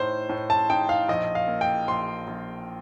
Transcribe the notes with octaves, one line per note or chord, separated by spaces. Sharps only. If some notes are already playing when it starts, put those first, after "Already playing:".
Already playing: A2 D#4 C5
A2
A5
D#4 G5
F5
A#1 D#5
F5
A#3
G5
A#1 C6
A#1